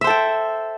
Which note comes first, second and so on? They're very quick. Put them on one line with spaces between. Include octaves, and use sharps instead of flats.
E5 C5 A4 G5